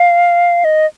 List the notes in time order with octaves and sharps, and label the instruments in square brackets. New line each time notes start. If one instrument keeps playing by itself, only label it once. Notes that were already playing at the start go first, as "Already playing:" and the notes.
Already playing: [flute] F5
D#5